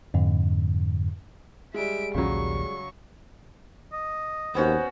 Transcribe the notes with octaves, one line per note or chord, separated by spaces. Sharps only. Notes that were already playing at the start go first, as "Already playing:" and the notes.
F2 G#2 D3
G3 G#3 E5 D7
A#1 D#2 C#3 F#3 C#6
D#5
D#2 B3 C#4 F#4 C5